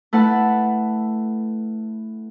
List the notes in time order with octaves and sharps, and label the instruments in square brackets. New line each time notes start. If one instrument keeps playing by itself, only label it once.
[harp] A3 E4 B4 F#5 A5